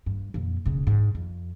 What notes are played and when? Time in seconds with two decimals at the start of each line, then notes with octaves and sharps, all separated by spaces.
0.06 G2
0.34 F2 A#2
0.66 E1 C#3
0.87 G#2
1.15 F2